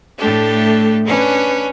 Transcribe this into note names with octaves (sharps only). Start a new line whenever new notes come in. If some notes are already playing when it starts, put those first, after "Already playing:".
A2 A3 D4 G4 A4
C#4 D4 B4